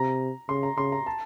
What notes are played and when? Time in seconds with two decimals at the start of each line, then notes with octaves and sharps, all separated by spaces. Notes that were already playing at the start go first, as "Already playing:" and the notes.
Already playing: C3 A#5
0.49 C#3 C6
0.63 A#5
0.77 C#3 C6
0.92 A#5
1.06 A5